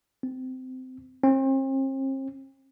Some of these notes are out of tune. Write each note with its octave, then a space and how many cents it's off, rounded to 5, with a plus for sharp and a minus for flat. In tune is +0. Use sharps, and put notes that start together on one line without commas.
C4 -25
C4 +40